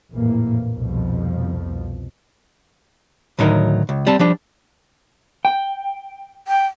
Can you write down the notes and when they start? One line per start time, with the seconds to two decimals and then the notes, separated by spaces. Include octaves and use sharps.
0.14 A#1 F2 A2 E3 A#3
0.73 C2 F2 B2 F3
3.39 D2 A2 D#3 F#3 D#4 A#4
3.89 C#2
4.07 G3 C4 A5
4.19 F3 G3 D4
5.45 G5
6.48 G5